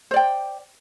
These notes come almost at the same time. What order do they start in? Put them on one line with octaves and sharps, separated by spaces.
C5 D5 G5